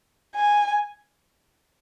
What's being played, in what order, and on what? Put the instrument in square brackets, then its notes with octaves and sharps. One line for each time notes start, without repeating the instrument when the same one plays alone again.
[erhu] G#5